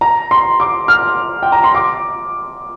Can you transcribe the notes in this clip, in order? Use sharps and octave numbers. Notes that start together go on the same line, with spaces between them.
A#5
C6
D6
F6
G5
A#5
C6
D6